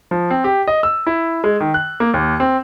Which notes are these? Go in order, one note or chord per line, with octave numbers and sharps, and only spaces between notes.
F3
C4
G4
D#5
E6
E4
G#3
D#3
F#6
A#3
D#2
C4